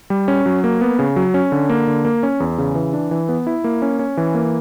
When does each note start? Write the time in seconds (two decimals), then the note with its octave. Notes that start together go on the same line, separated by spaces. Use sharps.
0.10 G3
0.28 C#4
0.46 F#3
0.64 A#3
0.81 B3
0.99 C#3
1.16 F#3
1.34 C#4
1.52 D3
1.69 A#3
1.87 D3
2.05 A#3
2.23 C#4
2.40 E2
2.58 C#3
2.75 E3
2.93 D4
3.11 E3
3.29 B3
3.47 E4
3.64 A#3
3.82 C#4
3.99 C#4
4.17 E3
4.34 A#3